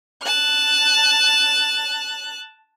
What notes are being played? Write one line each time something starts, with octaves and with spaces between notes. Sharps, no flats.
A5 F#6